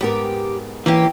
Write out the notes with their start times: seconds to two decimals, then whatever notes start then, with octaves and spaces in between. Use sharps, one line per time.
0.01 G#2 B3 G4 A#4
0.86 E3 A#3 C#4 G4